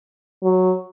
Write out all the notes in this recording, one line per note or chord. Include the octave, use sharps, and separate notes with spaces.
F#3